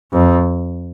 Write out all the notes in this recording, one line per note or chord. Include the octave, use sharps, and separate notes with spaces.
F2